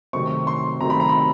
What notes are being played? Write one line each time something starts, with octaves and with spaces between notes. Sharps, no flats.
C3 D#3 F#3 A3 C4 C#6
C6
C3 D#3 F#3 A3 C4 A#5
B5
A#5
B5